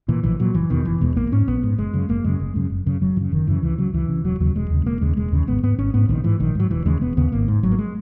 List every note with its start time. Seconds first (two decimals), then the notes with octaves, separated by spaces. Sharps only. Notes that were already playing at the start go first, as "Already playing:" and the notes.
0.08 A#2 E3
0.24 A#1 E3
0.40 A#2 F#3
0.54 F#1 E3
0.70 E2 B2 D#3
0.85 F#1 E3
1.01 E2 B2 G#3
1.16 A#1 A#3
1.32 G#2 C#4
1.47 A#1 B3
1.63 G#2
1.78 F#1 G#3
1.93 F#2 C#3
2.09 F#1 A#3
2.24 F#2 C#3 G#3
2.40 F#1
2.55 F#2 C#3
2.70 F#1
2.86 F#2 C#3
3.01 F#1 F#3
3.16 F#2 E3
3.21 C#3
3.31 F#1 D#3
3.47 F#2 C#3 E3
3.62 C#2 E3
3.78 C#3 F#3
3.94 C#2 E3
4.09 C#3
4.24 E1 F#3
4.40 D#2 C#3 F#3
4.55 E1 G#3
4.70 D#2 C#3
4.86 E1 A#3
5.01 D#2 C#3 G#3
5.17 E1 G#3
5.32 D#2 C#3
5.47 G#1 B3
5.63 G#2 B3
5.78 G#1 C#4
5.94 G#2 B3
6.09 A#1 D#3
6.24 G#2 E3
6.40 A#1 D#3
6.55 G#2 F#3
6.71 E1 E3
6.86 D#2 C#3 G#3
7.02 E1 B3
7.17 D#2 C#3 B3
7.32 G#1 A#3
7.48 G#2
7.63 G#1 F#3
7.72 A#3
7.79 G#3